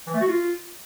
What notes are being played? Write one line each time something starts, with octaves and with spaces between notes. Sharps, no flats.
E3
A3
F#4
F4